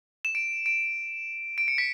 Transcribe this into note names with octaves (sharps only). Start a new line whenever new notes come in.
E7
D7
D7
D7
C#7
B6